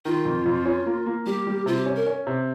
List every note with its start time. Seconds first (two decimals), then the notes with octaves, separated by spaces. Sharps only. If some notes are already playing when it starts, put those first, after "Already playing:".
0.05 D#3 F4
0.25 F2
0.46 F2
0.66 C#4
0.86 A#3
1.06 A#3
1.26 G3 G4
1.47 G3
1.66 C3 F4
1.76 G4
1.86 C#4
1.96 A#4
2.06 C#4
2.27 C3